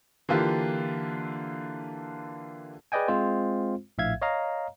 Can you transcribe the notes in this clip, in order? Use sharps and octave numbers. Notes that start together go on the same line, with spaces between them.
D3 E3 A#3 F4 G4
G#4 B4 D5 D#5 G5 G#5
G#3 C4 F4 C5
A#1 A2 E5 F5 G#6
C#5 D#5 F5 A#5